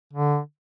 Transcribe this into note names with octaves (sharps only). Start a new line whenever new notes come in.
D3